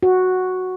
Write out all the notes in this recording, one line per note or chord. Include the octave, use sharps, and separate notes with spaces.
F#4